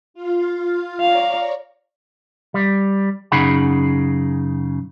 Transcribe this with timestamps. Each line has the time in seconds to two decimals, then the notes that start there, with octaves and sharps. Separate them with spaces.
0.14 F4 F5
1.00 C#5 D5 F5 A#5
2.54 G3
3.32 F#2 C#3 D#4 G#4 F#5 B5